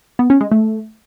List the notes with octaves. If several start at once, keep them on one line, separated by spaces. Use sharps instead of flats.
B3
C#4
G#3
A3